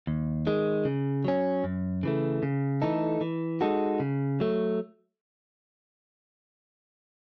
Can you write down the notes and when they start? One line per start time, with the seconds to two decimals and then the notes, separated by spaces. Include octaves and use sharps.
0.07 D#2
0.47 D#3 G#3
0.85 C#3
1.25 F#3 C#4
1.64 F#2
2.03 C#3 E3 A3
2.43 C#3
2.82 E3 A3 D#4 A4
3.21 E3
3.61 G#3 D#4 F#4 A4
4.00 C#3
4.40 F#3 A3